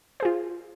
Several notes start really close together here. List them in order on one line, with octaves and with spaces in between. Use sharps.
C5 G#4 F4